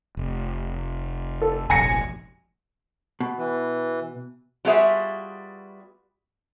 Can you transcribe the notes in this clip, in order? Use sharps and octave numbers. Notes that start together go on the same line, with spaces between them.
F1
A4
F1 A#1 G#5 A#6 C#7
B2
E3
G3 B3 F4 F#4 G#4 E5